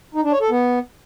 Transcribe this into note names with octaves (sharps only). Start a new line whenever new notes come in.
D#4
D4
C#5
A4
B3